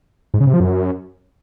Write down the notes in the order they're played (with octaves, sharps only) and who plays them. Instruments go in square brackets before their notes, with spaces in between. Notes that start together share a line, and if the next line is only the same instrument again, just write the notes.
[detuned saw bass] G#2
C#3
C3
F3
F#2